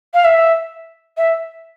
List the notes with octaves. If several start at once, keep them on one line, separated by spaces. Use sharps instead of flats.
F5
E5
E5